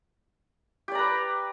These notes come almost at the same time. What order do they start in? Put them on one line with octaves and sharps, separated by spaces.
G4 D5 A#5 B4